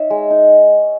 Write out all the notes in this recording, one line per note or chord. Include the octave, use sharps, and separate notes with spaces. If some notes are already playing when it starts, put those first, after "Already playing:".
Already playing: D#4 C#5 E5
G#3
D#4